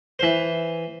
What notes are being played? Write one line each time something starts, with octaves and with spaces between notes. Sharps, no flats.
E3 C5